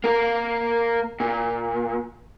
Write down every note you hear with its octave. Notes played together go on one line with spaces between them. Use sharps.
A#3 A#4
A#2